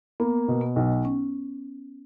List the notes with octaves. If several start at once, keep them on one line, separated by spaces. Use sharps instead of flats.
A#3 B3
B2
B3
B1
C#4